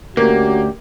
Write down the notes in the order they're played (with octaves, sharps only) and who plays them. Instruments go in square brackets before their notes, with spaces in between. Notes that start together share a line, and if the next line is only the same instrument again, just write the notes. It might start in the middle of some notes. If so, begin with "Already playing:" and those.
[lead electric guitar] D2 [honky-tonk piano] A#3 [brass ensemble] C#4 F#4 G4